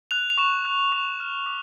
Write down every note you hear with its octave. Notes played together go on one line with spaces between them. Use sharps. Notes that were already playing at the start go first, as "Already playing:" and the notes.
F#6 F7
F7
C#6 E7
F#6
C#6
F6
D6